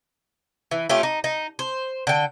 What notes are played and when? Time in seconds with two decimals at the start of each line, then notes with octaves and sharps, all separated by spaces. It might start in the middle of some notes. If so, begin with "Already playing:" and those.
0.71 E3
0.89 A3 C#4 F4 G4
1.03 D#4
1.24 D#4
1.59 C5
2.07 D3 G5